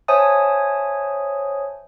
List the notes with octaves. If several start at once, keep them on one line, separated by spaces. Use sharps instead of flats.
C5 C#5 E5 G#5 A5 D#6